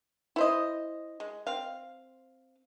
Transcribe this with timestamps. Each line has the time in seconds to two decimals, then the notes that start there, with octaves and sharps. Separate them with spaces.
0.36 E4 C5 D#5
1.20 G#3
1.47 C4 F5